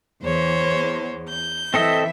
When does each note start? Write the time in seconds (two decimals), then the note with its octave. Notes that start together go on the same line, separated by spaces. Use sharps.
0.24 E2 C5 C#5
1.28 G6
1.74 E3 C4 A4 D#5 E5